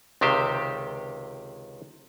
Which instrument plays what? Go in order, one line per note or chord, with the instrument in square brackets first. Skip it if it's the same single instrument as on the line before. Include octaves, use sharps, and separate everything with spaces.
[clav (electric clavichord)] C#2 C3 D#3 G4 C5